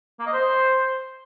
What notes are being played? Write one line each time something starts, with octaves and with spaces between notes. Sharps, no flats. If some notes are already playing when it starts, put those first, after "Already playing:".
A#3
D#5
C5